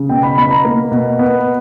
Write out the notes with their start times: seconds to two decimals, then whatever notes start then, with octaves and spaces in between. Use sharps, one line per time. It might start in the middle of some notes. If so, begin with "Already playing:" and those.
Already playing: C#3
0.09 B2 G5
0.23 B5
0.37 B2 B5
0.51 A#5
0.65 A#3
0.92 B2
1.19 B3